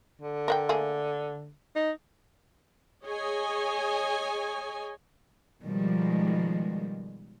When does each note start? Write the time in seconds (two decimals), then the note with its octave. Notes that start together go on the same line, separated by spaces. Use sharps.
0.21 D3
0.48 A#4 F#5 G5
0.69 A3 A#3 G#4
1.76 D#4
3.06 G#4 C#5 D#5 G#5
5.63 B2 D#3 F3 G3 G#3